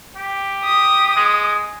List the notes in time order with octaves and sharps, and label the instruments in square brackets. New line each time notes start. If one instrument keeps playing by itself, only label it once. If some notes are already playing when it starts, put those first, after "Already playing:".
[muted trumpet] G4
[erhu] D#6
[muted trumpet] G#3